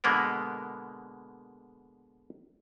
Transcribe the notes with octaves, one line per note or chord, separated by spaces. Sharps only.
B2 D3 G#3 A#3 B3 A#4